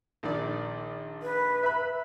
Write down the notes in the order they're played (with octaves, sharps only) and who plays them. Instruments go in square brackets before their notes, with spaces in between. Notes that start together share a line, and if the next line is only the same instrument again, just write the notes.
[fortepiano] A#1 D#3 D5
[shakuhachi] B4
[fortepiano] E5 B5